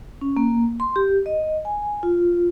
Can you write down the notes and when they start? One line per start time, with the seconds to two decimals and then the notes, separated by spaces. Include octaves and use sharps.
0.21 C#4
0.37 A#3
0.80 C6
0.96 G4
1.26 D#5
1.65 G#5
2.03 F4